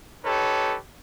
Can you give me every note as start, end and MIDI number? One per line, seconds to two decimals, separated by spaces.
0.25 0.77 63
0.25 0.77 67
0.25 0.77 69
0.25 0.77 71
0.25 0.77 73